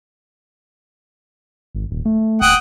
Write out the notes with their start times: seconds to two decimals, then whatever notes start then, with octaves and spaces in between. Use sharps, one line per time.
1.75 G#1
1.91 D#1
2.05 A3
2.42 D1 F#5 G5 D#6